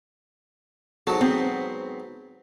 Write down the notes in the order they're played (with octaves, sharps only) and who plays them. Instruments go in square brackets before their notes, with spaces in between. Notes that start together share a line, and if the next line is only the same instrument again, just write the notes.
[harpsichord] G#2 F#3 [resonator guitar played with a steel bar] A4
[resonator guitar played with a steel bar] B3 C4